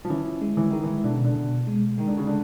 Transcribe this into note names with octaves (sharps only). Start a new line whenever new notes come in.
F3
E3 C#4
G#3
E3
D#3 G#3
E3
B2 D3
C#3
D3
B2
G#3
D#3 G#3
D3
C#3
D3